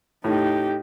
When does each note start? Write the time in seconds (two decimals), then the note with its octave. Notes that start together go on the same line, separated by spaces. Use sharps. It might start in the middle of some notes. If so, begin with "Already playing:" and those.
0.24 A2 D#4 G4